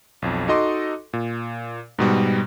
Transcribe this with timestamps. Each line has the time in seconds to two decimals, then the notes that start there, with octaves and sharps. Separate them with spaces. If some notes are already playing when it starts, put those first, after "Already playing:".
0.22 B1 F2
0.48 D#4 F#4 A4 D#5 C6 D6
1.13 A#2
1.99 G#2 B2 G3